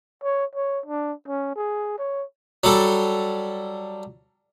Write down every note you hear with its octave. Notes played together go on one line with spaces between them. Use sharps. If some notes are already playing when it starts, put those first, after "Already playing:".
C#5
C#5
D4
C#4
G#4
C#5
F#3 G3 A4